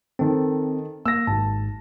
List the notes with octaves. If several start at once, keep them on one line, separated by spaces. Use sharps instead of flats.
D#3 C4 A4
A#3 E6 A#6
G#1 G#2 A5